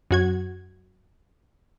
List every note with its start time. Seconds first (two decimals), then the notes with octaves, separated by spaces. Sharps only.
0.11 F#2 F#4 G#6